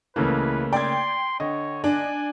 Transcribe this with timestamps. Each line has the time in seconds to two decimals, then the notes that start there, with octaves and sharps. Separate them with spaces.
0.16 C#2 C#3 E3 A3 A#3 B4
0.73 D5 G5 C6 G#6
1.40 D3 C#5 D#5
1.84 D4 G#5